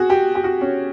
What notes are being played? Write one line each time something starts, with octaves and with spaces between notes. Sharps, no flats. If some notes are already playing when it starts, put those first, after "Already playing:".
Already playing: F#4 G#4
G4
G4
F#4
C#4